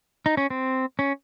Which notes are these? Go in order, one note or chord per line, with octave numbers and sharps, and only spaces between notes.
D#4
C#4
C4
C#4